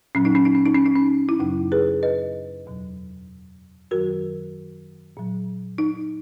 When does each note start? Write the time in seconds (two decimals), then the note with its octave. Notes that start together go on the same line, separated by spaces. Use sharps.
0.15 A#2 F#3 C#4
0.25 D#4
0.35 C#4
0.45 D#4
0.55 C#4
0.66 D#4
0.75 C#4
0.86 D#4
0.95 C#4
1.29 E4
1.39 F#2 C#3 F#3 D#4
1.72 G#4 B4
2.03 B4 D#5
2.66 E2 B2 F#3
3.91 F#2 D#3 F#3 F#4 A#4
5.17 A#2 F#3
5.78 D#4